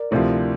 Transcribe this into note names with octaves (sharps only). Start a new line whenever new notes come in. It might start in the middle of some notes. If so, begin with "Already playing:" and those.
Already playing: A#4 D5
D2 C3 F3 E4